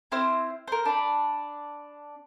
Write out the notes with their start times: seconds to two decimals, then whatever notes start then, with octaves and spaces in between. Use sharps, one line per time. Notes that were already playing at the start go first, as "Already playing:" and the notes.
0.12 C4 E4 C5 F6
0.68 A#4 C5
0.85 D4 B5